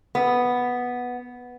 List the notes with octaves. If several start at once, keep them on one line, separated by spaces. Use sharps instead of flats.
B3